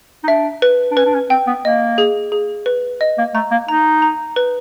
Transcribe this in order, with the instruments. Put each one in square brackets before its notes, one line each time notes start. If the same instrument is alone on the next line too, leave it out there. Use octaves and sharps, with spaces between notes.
[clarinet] D#4
[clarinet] D4 [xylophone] E5
[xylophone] B4
[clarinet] D4
[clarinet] C#4 [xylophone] B4
[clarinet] D4
C#4
[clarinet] C4 [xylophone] G5
[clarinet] B3
[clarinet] A#3 [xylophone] D#5
[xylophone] G#4
G#4
B4
D#5
[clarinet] A#3
[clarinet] A3 [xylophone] A#5
[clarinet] A#3
[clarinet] D#4 [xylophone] A#5
[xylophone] A#5
B4